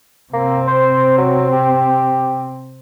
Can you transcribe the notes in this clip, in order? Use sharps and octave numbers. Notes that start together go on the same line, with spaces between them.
C3 A#3 C4
C5
F#3
G4